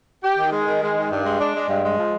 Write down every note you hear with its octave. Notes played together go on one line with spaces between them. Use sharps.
G4
D#3
G#3
D#3
G#3
D#3
G2
G#3
D4
G#3
G2
G#3
F3